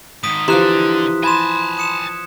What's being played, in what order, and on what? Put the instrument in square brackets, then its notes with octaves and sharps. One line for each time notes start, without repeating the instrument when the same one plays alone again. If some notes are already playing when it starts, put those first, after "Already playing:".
[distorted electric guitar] G#2 D#3 [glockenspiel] D#6 B6
[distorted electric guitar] D3 [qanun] E3 F3 [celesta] G4 A#5 E7 [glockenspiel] C6 F#6
[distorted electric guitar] G#5 A5 [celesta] B5 C6 [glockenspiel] G#6 E7
[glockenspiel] D#6 C#7 E7